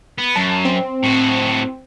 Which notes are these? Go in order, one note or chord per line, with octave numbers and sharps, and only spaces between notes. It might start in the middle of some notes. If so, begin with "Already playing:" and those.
B3
F#2 A5
C4
A2 F#4